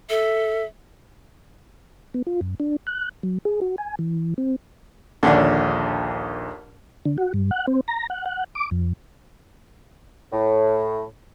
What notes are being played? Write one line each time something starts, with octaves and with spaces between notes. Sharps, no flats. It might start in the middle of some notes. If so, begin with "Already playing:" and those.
A4 E5
B3
F4
F#2
D4
F#6
F#3
G#4
F#4
G#5
E3
C4
A#1 D#2 D3 C#4 D4
D3
F#4
G2
F#5
C4
A#5
F#5
F#5
D6
F2
A2